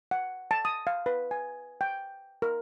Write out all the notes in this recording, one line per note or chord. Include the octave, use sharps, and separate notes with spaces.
F#5
A5
D#6
F5
B4
G#5
G5
A#4